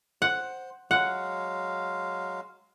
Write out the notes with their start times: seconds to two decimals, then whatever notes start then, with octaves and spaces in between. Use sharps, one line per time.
0.22 C5 F#5
0.91 F#3 G#3 F5 F#5